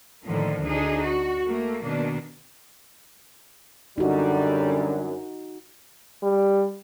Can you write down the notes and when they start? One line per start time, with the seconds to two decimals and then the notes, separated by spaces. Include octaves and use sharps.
0.23 A2 D3 D#3 F3 A#3
0.63 D2 D4 D#4 G#4
1.01 F#4
1.45 A3 A#3
1.82 B2 D#3 A#3 D4
3.98 F#2 D3 F#3 G3 D#4 F#4
6.23 G3